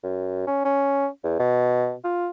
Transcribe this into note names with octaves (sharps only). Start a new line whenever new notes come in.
F#2
C#4
C#4
E2
B2
F4